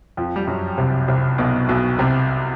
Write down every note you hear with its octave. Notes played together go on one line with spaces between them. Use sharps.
F2 F3
G3
F#2 F#3
C2 C3
C2 C3
B1 B2
B1 B2
C2 C3